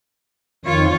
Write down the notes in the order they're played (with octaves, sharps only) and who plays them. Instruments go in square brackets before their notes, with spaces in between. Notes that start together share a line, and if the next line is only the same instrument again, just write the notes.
[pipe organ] F2 D#3 [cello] F4 C#5